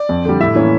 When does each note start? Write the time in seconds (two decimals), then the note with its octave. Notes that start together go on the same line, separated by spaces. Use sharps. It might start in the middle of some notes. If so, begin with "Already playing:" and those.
Already playing: D5
0.09 F2
0.25 D3 G3
0.40 A2 E5
0.55 E3 A#3 C#4